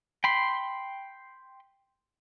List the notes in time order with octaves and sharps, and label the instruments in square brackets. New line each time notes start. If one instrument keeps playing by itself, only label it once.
[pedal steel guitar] G5 B5 C6